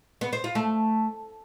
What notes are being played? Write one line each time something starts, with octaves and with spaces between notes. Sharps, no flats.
B3
C5
F4
A3